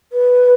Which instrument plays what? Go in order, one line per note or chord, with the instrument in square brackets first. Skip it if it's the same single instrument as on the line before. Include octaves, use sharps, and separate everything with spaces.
[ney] B4